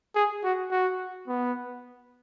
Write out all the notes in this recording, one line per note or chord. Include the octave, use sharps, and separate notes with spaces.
G#4
F#4
F#4
B3